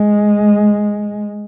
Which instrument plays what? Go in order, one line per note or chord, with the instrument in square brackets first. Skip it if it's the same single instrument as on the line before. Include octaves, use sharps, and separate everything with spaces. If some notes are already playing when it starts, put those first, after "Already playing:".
Already playing: [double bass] G#3